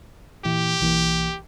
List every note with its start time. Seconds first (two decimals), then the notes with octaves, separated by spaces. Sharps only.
0.45 A#2 E3 E4 G4
0.81 B1 E3 A#3